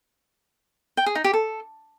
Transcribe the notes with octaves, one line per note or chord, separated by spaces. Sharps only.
G5
G#4
D#4
G4
A4